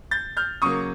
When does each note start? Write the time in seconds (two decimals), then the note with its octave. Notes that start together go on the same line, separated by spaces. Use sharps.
0.11 G6 A6
0.37 F6 G6
0.62 C#3 F#3 A#3 C#6 D#6